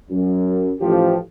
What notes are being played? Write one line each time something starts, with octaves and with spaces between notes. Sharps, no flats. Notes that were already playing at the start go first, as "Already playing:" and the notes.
F#2
A1 F3 G4